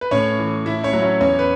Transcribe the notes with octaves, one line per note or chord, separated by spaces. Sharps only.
B4
A2 C#4 C#5
E3
A2 E4 E5
C#4 C#5
F#3
C#4 C#5
E2 C#4 C#5
B4